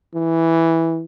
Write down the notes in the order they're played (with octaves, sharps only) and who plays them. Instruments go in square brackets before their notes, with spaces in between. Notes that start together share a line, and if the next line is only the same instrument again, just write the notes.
[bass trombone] E3